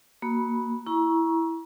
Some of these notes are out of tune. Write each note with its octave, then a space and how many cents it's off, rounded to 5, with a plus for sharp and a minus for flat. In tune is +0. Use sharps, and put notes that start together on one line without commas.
A#3 +0 F#4 +10 B5 -10
E4 +0 A#5 +30 C#6 +0